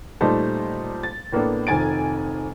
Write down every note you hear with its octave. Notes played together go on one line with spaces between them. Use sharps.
A#2 G3 A3 D#4 C5 A5
A6
A2 A#3 B3 D4 A4
F1 F2 D#3 G#5 A6 D7